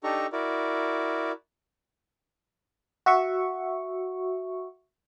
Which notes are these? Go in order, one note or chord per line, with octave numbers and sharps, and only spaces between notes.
D4 D#4 G4 A4 A#5 C#6
E4 F#4 A#4 D5
F#4 E5 C#6